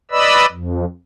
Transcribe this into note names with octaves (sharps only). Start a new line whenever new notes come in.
B4 D5 D#5 B5 E6
F2